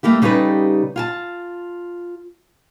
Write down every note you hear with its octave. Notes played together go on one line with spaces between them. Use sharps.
G3 A3 A#3 E4 G4
C#3 G3 D#4 G4 A4 B4
F4 G#5 A5